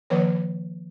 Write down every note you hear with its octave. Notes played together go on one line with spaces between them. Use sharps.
D#3 F3 A#3 B4 C#5